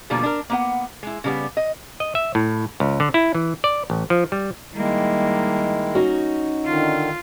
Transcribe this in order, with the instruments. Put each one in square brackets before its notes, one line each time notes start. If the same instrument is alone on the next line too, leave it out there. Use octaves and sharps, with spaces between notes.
[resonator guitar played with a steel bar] B2 D3 F3 G3 A#3
D4 A#4
A#3 B3 F#5
G#3 E4
C#3 G3 B3
D#5
[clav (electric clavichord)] D#5
E5
A2
C#2
D3
E4
E3
D5
A1
F3
G3
[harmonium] D#3 G#3 E4 [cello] G3 A#3
[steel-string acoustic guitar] C#4 D#4 F#4
[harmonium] D3 D#3 [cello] F4